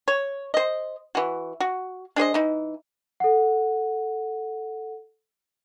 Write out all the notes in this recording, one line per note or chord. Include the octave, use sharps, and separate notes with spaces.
C#5
C5 D#5
E3 F#4
F#4
D4 G#4 C5 D#5
E3 D#4
A4 F#5